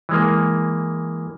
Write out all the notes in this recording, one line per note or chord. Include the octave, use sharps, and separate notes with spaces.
E3 G#3 A#3